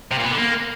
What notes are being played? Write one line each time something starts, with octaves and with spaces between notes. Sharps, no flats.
C3
A#2
B3
D3
A#3